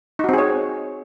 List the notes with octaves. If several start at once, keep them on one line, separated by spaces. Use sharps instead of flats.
C4 D#4 F#4 G#4 C#5